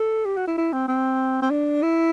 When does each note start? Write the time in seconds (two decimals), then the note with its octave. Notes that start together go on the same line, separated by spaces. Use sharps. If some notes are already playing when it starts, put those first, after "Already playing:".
Already playing: A4
0.25 G4
0.37 F#4
0.47 E4
0.58 E4
0.73 C4
0.88 C4
1.42 C4
1.51 D4
1.82 E4